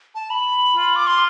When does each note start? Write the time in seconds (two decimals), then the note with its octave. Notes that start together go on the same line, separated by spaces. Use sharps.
0.15 A5
0.30 B5
0.77 F4
0.96 D6
1.07 C6